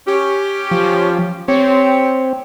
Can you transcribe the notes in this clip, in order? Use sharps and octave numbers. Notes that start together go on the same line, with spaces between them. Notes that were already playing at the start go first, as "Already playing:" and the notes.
C#4 G4
F3
C4 G4 C#5